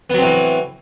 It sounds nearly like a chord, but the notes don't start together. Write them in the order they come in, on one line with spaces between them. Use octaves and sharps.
B3 F#3 C4 A2 E3